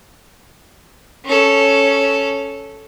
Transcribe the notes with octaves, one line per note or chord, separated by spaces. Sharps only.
C#4 A4